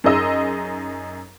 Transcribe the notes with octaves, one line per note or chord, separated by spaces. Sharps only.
F#2 D#4 G#4 D#5 E6